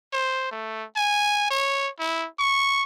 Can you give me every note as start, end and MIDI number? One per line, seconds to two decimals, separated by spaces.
0.13 0.49 72
0.51 0.84 57
0.96 1.50 80
1.50 1.89 73
1.99 2.27 64
2.39 2.83 85